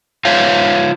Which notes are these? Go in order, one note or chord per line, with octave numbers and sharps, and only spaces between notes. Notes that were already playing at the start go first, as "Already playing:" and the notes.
F4 C5 C#5 E5 F5